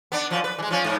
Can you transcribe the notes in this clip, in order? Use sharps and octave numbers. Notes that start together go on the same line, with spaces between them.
B3 D4
F#2 F3
B4
E3 G#3
F3 C#4
G#2